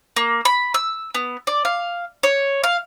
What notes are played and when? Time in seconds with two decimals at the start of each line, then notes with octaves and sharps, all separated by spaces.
0.16 A#3
0.45 B5
0.74 E6
1.14 B3
1.47 D5
1.65 F5
2.23 C#5
2.64 F5